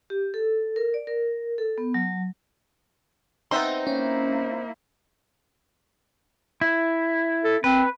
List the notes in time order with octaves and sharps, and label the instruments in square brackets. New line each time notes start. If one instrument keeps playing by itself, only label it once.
[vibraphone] G4
A4
A#4
D5
A#4
A4
B3
F#3
[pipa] B3 E5 C6 [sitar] C4 D#4
[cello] A#3 E4 [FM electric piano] C#4
[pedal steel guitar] E4
[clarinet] A4
[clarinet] C4 [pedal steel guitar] B4